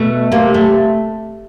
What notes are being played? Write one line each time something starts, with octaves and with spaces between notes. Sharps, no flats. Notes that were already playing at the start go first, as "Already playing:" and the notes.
Already playing: B2 A3
C3 A#3
A3